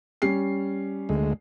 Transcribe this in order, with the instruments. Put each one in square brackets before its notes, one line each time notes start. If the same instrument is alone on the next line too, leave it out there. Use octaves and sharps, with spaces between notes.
[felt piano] G3 C#4 C7
[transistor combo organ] D2 G#3